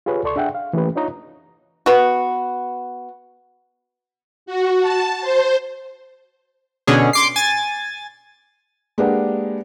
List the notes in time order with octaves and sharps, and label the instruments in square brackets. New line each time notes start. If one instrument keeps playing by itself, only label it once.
[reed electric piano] F4 G4 G#4 B4 C#5
C#2 A4 D5 C6 C#6
D4 G#4 E5 F#5 G5
F5
E3 A3 A#3 C#4 G4 B4
D4 D#4 F4 C#5 D#5 A#5
[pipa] B3 F#4
[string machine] F#4
A5
C5
[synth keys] B2 D3 C#4 G#4
C6 D6 C7
G#5 A6
[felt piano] G#3 A#3 D4 G4 B4 F#5